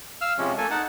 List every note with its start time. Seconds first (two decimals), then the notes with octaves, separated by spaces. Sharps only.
0.21 F5 E6 F6
0.38 C3 F3 G#3 C#4
0.58 A3 A#3 A4 G#5
0.71 D#4 F#5 A5